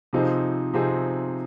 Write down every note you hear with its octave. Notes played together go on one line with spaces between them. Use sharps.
C3 F3 C4 D#4 G#4
C3 F3 C4 D#4 G#4